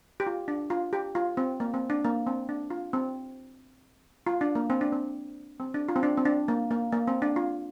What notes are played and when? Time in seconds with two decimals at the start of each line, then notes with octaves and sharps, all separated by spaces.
0.20 G4
0.27 F4
0.48 D4
0.70 F4
0.93 G4
1.15 F4
1.37 C4
1.60 A#3
1.74 C4
1.90 D4
2.05 A#3
2.27 C4
2.49 D4
2.70 F4
2.93 C4
4.27 F4
4.41 D4
4.55 A#3
4.70 C4
4.81 D4
4.92 C4
5.60 C4
5.74 D4
5.89 F4
5.96 C4
6.03 D4
6.17 C4
6.25 D4
6.48 A#3
6.71 A#3
6.92 A#3
7.08 C4
7.22 D4
7.36 F4